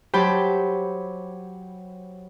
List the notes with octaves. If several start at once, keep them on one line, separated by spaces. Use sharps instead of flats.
F#3 G4 C5 A5 B5 G6